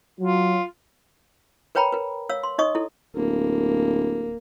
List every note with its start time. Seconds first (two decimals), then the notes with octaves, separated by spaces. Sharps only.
0.20 F#3 F4
1.75 A#4 B4 C#5 G5 A#5 B5
1.92 A#4 B4
2.29 C#5 F5 E6
2.43 C6
2.58 D#4 C#5 D#5 C#6 D#6
2.75 E4 A4
3.15 D1 A#3